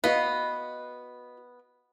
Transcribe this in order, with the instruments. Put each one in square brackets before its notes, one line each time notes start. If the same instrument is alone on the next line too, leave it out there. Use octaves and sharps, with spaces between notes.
[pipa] B3 [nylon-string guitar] F#4 D#5 F5